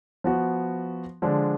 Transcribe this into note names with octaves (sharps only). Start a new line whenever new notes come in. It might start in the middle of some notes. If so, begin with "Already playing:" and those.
F3 B3 F#4
D3 F3 G#3 D4